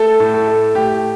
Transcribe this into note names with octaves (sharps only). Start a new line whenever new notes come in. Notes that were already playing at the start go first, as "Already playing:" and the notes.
Already playing: A3 A4
A2
A4
A3
A2 G4